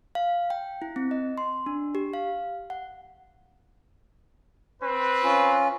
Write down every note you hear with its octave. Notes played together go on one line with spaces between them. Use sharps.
F5
G5
E4
C4
D#5
C6
D4
G4
F5
F#5
C4 B4
C#4 F4